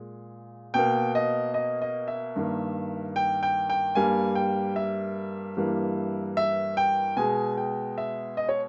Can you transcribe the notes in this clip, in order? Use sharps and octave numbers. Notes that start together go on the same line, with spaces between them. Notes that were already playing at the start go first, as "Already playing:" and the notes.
Already playing: A#2 G#3
B2 A#3 G5
D#5
D#5
D#5
E5
G2 D#3 A#3
G5
G5
G5
G2 G3 A#3 G#5
G5
E5
G2 E3 G3 A#3
E5
G5
B2 G#3 G#5
G5
E5
D#5
C#5